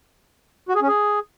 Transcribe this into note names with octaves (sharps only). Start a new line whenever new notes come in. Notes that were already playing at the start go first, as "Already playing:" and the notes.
F#4
G#4
C#4
G#4